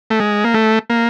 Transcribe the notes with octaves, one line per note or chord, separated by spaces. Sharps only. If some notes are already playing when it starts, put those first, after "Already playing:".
A3
G#3
A#3
A3
A#3